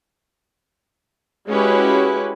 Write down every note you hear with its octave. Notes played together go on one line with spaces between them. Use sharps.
G#3 C#4 E4 F#4 G4 B4